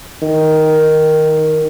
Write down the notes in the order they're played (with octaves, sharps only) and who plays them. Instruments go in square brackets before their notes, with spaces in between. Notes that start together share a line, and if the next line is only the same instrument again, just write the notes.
[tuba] D#3